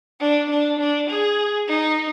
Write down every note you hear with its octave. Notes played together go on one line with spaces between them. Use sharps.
D4
D4
D4
G#4
D#4